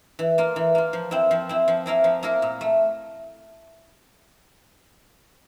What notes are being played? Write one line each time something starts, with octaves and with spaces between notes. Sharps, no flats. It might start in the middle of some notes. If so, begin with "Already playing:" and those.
E3
A#3 F4
E3
A#3 F4
F3
C4 E4
F3
C4 E4
F3
A#3 E4 A#4 F5
F3
A#3 E4 A#4 F5
A#2
A3